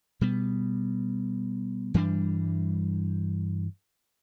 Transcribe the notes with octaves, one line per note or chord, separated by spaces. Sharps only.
B2 G3 B3
G2 E3 G3 D4